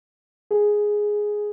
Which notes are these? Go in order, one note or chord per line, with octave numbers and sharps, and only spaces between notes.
G#4